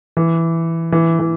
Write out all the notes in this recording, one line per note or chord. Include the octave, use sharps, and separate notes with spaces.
E3
E3
E3